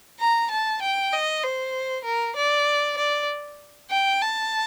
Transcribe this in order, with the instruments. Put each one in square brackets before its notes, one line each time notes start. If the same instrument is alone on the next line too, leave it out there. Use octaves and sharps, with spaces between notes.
[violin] A#5
A5
G5
D#5
C5
A#4
D5
D5
G5
A5